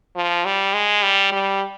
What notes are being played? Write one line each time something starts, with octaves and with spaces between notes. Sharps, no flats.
F3
G3
G#3
G3
G3